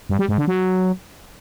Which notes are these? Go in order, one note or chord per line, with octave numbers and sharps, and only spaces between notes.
G2
G3
G#2
D3
F#3